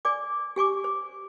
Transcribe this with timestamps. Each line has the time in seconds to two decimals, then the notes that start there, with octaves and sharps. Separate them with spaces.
0.05 D5 G#5 D6
0.56 G4 G#5 C#6 D6
0.84 C5